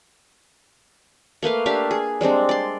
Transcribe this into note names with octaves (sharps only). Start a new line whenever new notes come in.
A3 A#3 B4 F5
D4 G4 E5 F5
G#4
G3 G#3 C4 D4
D5 C6